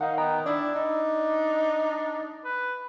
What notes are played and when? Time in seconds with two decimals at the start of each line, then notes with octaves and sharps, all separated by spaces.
0.01 D#3 D#4 F5 F#5
0.18 B3 D#5 G5 A#5
0.46 D4 E4 D5
0.75 D4 D#4
2.44 B4